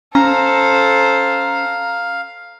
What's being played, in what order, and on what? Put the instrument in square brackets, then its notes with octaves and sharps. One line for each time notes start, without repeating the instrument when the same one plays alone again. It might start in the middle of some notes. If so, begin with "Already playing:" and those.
[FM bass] C#4 [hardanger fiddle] A4 C5 [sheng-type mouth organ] F5 [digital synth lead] A#5